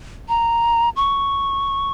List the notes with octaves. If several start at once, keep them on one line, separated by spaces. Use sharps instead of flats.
A#5
C#6